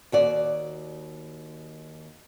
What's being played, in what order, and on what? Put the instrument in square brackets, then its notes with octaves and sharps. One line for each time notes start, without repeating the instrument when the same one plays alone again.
[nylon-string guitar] D#2 F#4 D5